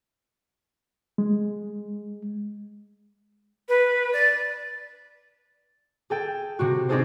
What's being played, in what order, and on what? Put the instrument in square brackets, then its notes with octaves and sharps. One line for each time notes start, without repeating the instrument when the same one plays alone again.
[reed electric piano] G#3
[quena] B4
D5
[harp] G#4 A4 G5
C3 C4 F#4
C4 D4 D#4 G#4 A4 C5